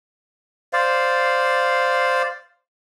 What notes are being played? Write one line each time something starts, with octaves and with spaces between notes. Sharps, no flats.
C5 D5 F5